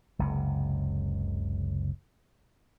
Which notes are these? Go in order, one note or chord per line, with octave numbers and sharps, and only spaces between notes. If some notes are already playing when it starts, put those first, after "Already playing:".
F#1 C#2 C3